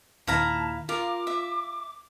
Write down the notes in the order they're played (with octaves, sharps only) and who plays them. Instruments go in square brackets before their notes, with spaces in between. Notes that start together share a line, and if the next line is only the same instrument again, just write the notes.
[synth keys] D#2 A#2 D#3 [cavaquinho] E4 F5 A#5 [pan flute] A5
[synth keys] F4 [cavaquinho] A#4 [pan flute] D6
[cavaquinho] E5